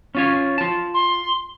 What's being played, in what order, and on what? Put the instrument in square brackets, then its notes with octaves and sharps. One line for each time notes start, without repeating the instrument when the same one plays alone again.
[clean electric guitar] C#4 F4 C#5
F4 A5
[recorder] C6